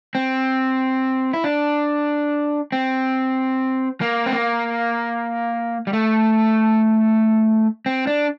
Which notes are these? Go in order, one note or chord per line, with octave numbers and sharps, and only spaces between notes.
C4
E4
D4
C4
A#3
C4
A#3
G3
A3
C4
D4